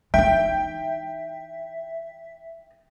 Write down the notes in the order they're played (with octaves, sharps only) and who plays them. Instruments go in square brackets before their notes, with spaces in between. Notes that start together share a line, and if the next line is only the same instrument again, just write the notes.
[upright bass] E3 D#4 [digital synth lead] E5 [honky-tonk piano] G5